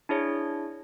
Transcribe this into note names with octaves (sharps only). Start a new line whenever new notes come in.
D4 E4 G#4 C#5